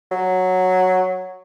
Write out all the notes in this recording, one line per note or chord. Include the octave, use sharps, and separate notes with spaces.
F#3